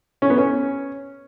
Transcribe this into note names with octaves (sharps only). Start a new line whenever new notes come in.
C#4
B3
C#4